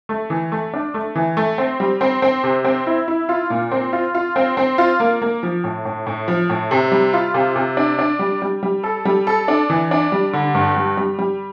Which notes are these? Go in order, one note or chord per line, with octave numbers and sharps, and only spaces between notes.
A3
E3
A3
D4
A3
E3
A3
C4
G3
C4
C4
C3
C4
E4
E4
F4
A#2
C4
F4
F4
C4
C4
F4
A#3
A#3
F3
A2
A2
A2
F3
A2
C3
G3
F4
C3
C3
D4
D4
G3
G3
G3
A4
G3
A4
D4
E3
D4
G3
D3
G2
G3
G3
G3